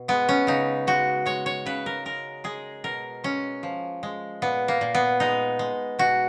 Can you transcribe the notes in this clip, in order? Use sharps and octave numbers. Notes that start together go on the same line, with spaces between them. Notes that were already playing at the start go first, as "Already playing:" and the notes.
Already playing: B2
G#3 B3
C#4
C#3 D#4
G#3 F#4
G#3 C#5
C#5
C#3 B4
A#4
G#3 A#4
G#3 G#4
B2 A#4
G#3 C#4
F3
G#3
A#2 B3
A#3
A#2
B3
G#3 D#4
G#3
B2 F#4